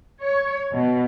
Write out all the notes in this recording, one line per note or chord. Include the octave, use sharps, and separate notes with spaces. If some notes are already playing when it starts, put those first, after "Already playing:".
C#5
B2